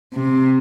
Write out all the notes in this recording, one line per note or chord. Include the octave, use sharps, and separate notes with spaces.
C3